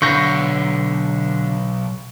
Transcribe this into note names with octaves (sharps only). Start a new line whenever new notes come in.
B1 D3 C#6 G6 A#6